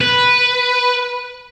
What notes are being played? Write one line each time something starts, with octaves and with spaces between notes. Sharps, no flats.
B4